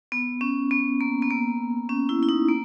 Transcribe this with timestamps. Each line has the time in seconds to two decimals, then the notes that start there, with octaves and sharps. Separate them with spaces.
0.12 B3
0.41 C#4
0.71 B3
1.01 A#3
1.22 B3
1.30 A#3
1.89 C#4
2.09 E4
2.23 E4
2.29 D#4
2.49 A#3